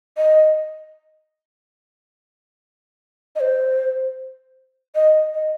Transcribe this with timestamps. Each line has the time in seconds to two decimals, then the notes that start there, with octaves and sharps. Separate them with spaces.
0.17 D#5
3.36 D#5
3.40 C5
4.95 D#5
5.35 D#5